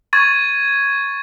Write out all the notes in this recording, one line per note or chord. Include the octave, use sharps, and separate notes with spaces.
C#6 G#6 A6 D#7